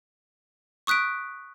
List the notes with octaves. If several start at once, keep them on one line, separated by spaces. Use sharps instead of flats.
C#6 D#6 F#6 B6 D7